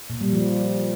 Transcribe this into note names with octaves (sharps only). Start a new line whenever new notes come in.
A#2
G3
F3